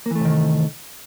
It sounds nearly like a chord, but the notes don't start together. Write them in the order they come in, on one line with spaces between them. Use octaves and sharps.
A#3 E3 A3 C3 D#3